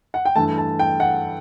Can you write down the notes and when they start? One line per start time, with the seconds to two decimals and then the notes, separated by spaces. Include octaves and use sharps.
0.14 F#5
0.25 G5
0.35 G2 E3 A3 A5
0.58 A5
0.79 G5
1.00 F#5